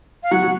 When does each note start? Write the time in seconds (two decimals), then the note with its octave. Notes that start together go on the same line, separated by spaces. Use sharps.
0.23 F5
0.31 F#3 F#5
0.42 F#3